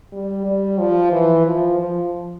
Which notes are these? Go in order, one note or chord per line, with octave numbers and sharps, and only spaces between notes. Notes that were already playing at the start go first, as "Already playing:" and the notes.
G3
G3
F3
E3
F3
F3